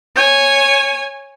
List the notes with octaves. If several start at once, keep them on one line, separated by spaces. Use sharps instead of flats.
C#5 G#5